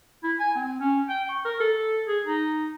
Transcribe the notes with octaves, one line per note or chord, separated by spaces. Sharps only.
E4
G#5
C4
C#4
G5
C#6
A#4
A4
G#4
D#4